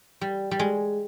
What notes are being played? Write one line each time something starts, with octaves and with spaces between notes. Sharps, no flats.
G3
G3
G#3